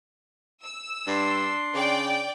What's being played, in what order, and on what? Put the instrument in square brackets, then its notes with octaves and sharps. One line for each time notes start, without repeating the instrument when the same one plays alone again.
[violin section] E6
[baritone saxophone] G2 [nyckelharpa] D4 C6
[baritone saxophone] C#3 [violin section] D5 G5